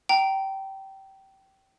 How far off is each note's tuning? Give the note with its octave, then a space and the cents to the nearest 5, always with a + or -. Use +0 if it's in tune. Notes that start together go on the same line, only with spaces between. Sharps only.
G5 -20 A#5 +0